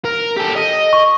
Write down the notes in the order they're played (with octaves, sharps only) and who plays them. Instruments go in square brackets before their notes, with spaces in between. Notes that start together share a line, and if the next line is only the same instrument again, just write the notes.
[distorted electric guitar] A#4
G4 A4
D#5
[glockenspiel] C#6